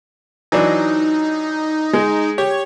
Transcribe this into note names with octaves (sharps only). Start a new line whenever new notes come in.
E3 F#3 D4 D#4
G#3
G4 C#5